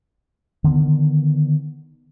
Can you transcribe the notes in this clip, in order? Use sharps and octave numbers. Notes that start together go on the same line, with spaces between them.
D3 D#3 B3